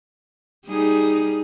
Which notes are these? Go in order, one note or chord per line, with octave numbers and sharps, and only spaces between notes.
G3 D#4 G#4